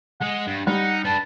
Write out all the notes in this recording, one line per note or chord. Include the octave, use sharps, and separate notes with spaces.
G#3 G#4 F#5
G2
G3 D#4 F#5
D4 B4 A5